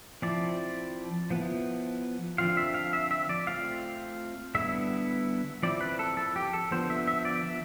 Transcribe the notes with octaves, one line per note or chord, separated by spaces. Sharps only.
F3 C4 E4 D5
F3 B3 E4
D3 F3 C4 F4 F5
E5
F5
E5
E5
D5
A3 C4 F4 F5
D3 G3 B3 E4 E5
F3 C4 E4 D5
B4
A4
A4
G4
A4
D3 F3 B3 C5
E5
E5
D5
E5